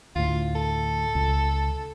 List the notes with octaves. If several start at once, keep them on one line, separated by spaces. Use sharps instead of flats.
D2 A2 F4
A4
C#2